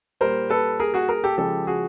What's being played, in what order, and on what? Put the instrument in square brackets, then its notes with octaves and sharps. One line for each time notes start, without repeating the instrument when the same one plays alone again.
[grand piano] A#2 G3 A#4 C5
A4 B4
G#4 A#4
F#4 G#4
G#4 A#4
G4 A4
C#3 F3 G#3 G4 A4
F#4 G#4